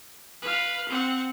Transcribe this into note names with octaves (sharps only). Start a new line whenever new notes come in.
B4 F5
C4 F#5